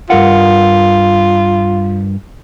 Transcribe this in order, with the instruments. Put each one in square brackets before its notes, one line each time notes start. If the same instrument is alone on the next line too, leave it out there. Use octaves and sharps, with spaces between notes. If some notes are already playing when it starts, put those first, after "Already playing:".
[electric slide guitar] G2 A#4 F#5 [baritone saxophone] F4